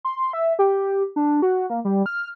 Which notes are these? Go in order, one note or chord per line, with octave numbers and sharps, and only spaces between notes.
C6
E5
G4
D4
F#4
A#3
G3
F6